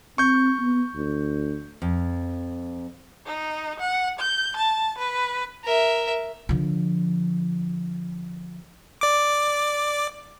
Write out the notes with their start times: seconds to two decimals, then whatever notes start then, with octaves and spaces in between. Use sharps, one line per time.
0.18 C4 C#6 G6
0.59 B3
0.95 D2
1.82 F2
3.26 D#4
3.80 F#5
4.19 G6
4.56 A5
4.98 B4
5.64 A#4 E5
6.49 D3 F3
9.01 D5 D6